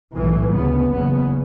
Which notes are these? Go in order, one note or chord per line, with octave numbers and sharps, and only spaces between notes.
B1 A2 E3
D2 C#3 B3
F#1 E2 C#3 B3